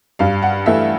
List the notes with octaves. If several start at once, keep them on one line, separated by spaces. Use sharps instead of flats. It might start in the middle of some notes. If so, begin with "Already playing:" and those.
G2 F5
F#5
E3 A3 E5